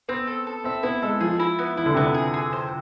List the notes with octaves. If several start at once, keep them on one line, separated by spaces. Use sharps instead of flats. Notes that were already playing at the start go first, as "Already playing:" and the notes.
B3 C4
A4
A4
C4 E5
B3 E4
G#3 A4
F3 G#4
E4
B3
E3 E4
D3
C3 B3
D3
G#4
G#4
C5